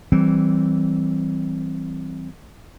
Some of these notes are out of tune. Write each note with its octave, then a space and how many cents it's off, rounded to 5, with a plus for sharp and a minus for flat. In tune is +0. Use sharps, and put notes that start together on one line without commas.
E3 +0 G3 -20 C4 +0